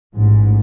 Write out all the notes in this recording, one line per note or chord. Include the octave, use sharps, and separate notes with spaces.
A1 G#2